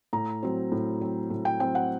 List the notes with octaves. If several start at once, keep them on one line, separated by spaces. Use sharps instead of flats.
A2 A#5
F#3 C4
A2
F#3 C4
A2
G5
F#3 C4 G5
F#5